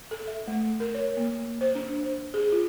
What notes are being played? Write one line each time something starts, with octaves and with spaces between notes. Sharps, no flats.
A4
E5
A3
A#4
C#5
A#3
C5
D4
C5
G#4
F4